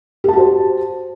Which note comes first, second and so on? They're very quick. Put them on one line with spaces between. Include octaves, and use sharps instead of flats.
G4 A5 F#4 C5